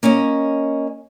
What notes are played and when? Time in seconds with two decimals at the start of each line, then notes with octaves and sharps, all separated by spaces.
0.03 A#3 C#4 C#5 D#5